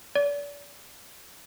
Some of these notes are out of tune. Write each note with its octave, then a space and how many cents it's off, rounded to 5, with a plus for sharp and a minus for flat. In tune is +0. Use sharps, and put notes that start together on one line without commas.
D5 -35